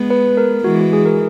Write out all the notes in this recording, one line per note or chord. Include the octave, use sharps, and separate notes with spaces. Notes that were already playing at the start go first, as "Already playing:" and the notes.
Already playing: G#3 B3
B4
A#4
E3 G#3 F#4
F#4
G#4
A#4